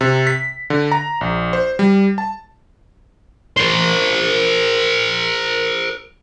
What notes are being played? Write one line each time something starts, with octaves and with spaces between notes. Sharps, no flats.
C3
B6
D3
A#5
A#1
C5
G3
A5
A#4 C5